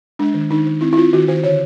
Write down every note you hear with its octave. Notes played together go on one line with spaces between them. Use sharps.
G#3 D4
D#3
D#3 D#4
D#3
C4 E4
E4
C4 F4
D#3 F#4
D#3 C5
D3 C#5